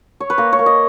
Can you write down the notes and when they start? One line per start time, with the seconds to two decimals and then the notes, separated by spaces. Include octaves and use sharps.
0.20 C#5
0.30 B4
0.38 A#3 A#4
0.53 C#5
0.59 A#3
0.66 D#5